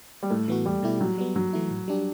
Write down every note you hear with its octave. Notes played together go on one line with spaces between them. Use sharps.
G3
A2 A3
E3 B3 F#4
E2 G3
B2 A3 E4 G4
A2 F#3
G3 B3
G2 F#3
E3 A3 E4
A2
G3 D4 G4